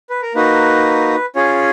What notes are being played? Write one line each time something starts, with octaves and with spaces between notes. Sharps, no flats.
B4
A#4
A#3 D#4 F#4 B4
C#4 F4 G#4 C#5